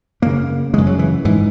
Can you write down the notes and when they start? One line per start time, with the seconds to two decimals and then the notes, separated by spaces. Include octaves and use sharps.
0.22 F#2 C#3 A#3
0.73 F#2 C#3 G#3
0.87 F#3
0.99 E3
1.25 G#2 E3